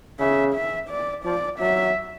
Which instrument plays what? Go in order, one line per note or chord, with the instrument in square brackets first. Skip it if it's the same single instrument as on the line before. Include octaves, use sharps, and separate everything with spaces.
[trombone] C#3 [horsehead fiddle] E5
[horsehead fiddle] E5
D5
[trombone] F3 [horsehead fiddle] D5
[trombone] F#3 [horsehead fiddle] E5